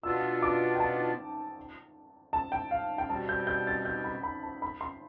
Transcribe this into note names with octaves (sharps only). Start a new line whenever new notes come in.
B2 B3 D4 F4 E6
D6
G5
A5
A5
G5
F5
G5
B2 G3 C4 A5
G6
G6
A6
G6
B5
B5
A5
B5
C6